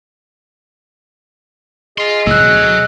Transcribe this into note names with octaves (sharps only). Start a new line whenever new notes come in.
G#4 D#5 F5 C6
C#2 A2 F#3 G#3 E6 F#6
D2 B2